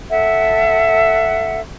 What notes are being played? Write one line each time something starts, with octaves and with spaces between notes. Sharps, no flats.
A4 E5 F#5